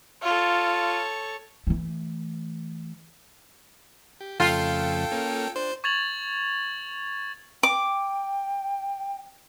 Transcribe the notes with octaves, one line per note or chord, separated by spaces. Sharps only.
F4 A4 C#5
E3 A3
G4
F2 C#3 A3 F4 A4 G5
A#3 C#4
D4 C5
C#6 G#6 A6 F7 F#7
G5 D6